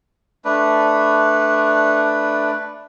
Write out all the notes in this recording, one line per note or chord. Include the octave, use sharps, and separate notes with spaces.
A3 D4 B4